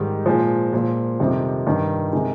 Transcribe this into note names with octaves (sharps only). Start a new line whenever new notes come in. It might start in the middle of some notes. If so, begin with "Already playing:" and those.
Already playing: G#2 D#3 G3
A#2 F3 G#3
A#2 F3
F2 C3 D#3 G3
G2 D#3
C3 D#3 G#3